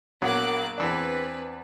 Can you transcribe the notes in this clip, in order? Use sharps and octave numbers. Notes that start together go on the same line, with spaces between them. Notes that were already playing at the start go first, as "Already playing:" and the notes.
A#1 F#3 A#3 B3 D6 F#6
E2 E3 C4 D4 B4